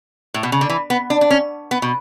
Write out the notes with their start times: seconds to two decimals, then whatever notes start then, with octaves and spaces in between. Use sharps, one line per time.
0.34 A2
0.43 B2
0.52 C#3
0.61 D3
0.69 E3
0.90 B3
1.10 D4
1.21 D4
1.30 C#4
1.71 B3
1.82 B2